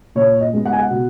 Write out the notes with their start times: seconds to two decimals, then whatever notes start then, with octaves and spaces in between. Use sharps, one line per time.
0.15 A#2 C#5
0.40 D#5
0.53 G#3 B3
0.65 F#5
0.73 G#5
0.79 F#5
0.90 B2